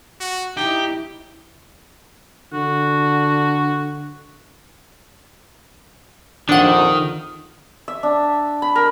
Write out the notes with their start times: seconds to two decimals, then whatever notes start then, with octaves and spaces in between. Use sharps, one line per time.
0.20 F#4
0.57 D#4 E4 G4
2.53 D3 F#4
6.49 A#1 F2 D#3 D4 F#5
7.88 E5
8.03 D4
8.62 B5
8.75 A#4